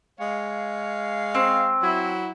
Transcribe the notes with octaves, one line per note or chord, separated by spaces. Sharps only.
G#3 C#5 F5
C4
F#3 E4